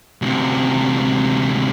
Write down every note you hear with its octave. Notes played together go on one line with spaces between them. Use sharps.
D2 C3